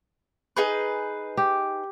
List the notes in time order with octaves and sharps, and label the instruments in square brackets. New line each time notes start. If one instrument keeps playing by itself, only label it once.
[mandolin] D#4 G#4 B4
[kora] G4